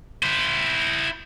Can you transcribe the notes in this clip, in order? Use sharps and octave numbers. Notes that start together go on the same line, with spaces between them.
E4 C5